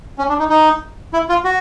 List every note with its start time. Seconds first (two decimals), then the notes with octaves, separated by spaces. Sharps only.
0.18 C#4
0.29 D4
0.39 D#4
0.50 D#4
1.13 E4
1.29 F4
1.44 F#4